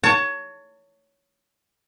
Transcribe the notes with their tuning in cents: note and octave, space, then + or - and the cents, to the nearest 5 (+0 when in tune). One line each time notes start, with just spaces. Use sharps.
C#5 +15 A5 +40